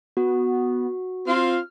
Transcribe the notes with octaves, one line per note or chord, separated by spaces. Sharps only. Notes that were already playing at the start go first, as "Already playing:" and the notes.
B3 F#4
C4 F4 F6